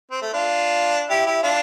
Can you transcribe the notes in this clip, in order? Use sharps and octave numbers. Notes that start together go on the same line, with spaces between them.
C4
A3
D4 F4
E4 G4
E4 G4
D4 F4